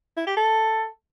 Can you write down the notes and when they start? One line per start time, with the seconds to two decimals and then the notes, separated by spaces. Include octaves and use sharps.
0.17 E4
0.27 G4
0.37 A4